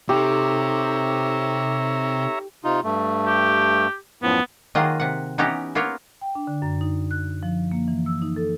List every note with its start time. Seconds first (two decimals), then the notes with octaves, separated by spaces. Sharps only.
0.09 C3 D#4 G4 A4 C#5 E5 A#5
2.64 C3 D#4 F4
2.84 G2 A3
3.27 G4
4.23 F#2 A2 F3 B3
4.75 D#3 F#3 A#3 F4 G#4 D#5
5.00 C3 F#5
5.38 E3 B3 C#4 D#4 G4 A#5
5.75 A#3 B3 F4 A#4 C#5
6.21 G5
6.35 D4
6.47 D3
6.62 F#2
6.81 D#4
7.11 F#6
7.43 F3
7.71 A#3
7.88 E3
8.06 E6
8.22 D#4
8.36 A4